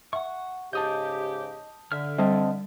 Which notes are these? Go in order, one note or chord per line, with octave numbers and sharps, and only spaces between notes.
E5 F#5 C#6
G#2 C#3 G4 D#5 A5 D#6 G6
D3 E5 F6
G3 C4 D#5 A5